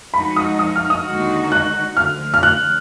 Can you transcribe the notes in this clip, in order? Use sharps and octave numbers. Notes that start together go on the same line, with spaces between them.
F3 G#3 D#4 F#4 B5
D#6
D#6
F6
D#6
D#2 D3 G#3 D#4 F#4
F#6
D2 D3 F3 F6
F6
F#6